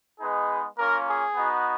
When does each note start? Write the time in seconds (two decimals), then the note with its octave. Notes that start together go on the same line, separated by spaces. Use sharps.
0.20 G#3 B3 D#4 G#4 B4
0.78 A#3 C#4 F4 A#4
1.06 G#4
1.35 B3 D#4 F#4